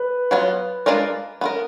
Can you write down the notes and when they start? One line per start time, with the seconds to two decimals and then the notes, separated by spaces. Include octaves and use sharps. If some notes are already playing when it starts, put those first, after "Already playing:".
Already playing: B4
0.31 F#3 B3 F4
0.86 G#3 D4 F4 A#4 D5
1.41 B3 F4 A#4